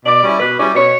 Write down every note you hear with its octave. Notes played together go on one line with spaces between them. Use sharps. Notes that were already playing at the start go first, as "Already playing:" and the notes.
B2 D5
G3 C#4 E4
B2 B4
G3 C#4 E4 D5
B2 C#5